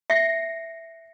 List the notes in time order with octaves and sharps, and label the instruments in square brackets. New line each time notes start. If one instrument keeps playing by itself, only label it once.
[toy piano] E5 [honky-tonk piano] A#6 C7 C#7